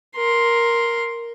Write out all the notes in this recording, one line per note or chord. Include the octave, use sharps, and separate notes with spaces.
A#4 C6